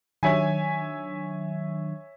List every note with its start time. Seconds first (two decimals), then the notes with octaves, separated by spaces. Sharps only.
0.23 D#3 F#3 D4 C#5 E5 G#5